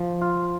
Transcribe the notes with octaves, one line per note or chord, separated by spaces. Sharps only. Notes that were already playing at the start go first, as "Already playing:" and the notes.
Already playing: F3
F4